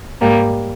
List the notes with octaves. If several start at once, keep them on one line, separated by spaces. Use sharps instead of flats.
G#2 G3 A#3